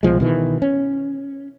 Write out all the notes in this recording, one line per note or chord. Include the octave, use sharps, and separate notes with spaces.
C2 B2 F3 G#3
B2 D#3 E3
C#4